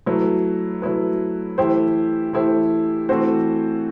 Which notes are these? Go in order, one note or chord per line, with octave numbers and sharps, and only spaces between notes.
F#3 A3 E4 B4
F#3 A3 E4 B4
E3 A3 E4 G4 C5
E3 A3 E4 G4 C5
E3 A3 C4 F#4 C5